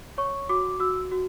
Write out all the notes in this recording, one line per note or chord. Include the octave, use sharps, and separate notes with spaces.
C#5 C#6
F#4 D6
F#4 E6
F#4